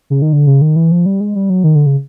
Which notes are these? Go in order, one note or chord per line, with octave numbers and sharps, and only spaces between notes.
C#3
D#3
D3
C#3
D#3
E3
F3
G3
G#3
G3
F#3
D#3
D3
C#3